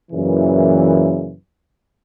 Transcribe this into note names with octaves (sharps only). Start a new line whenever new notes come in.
F#2 A#2 C#3 E3